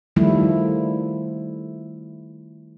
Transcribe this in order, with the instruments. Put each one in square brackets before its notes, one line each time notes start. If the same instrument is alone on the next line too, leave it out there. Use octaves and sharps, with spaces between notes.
[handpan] D#3 F3 G3 A3 E4